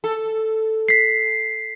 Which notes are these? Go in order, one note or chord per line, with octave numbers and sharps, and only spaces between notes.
A4
B6 C7